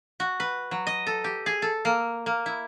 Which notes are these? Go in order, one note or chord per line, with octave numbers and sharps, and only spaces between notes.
F#4
B4
F#3
D#5
A4
G4
G#4
A4
A#3
A#3
E4